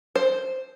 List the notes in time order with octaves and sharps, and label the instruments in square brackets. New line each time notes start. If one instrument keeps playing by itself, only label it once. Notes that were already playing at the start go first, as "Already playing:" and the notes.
[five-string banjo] C5